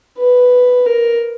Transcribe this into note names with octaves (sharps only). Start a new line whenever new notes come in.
B4
A#4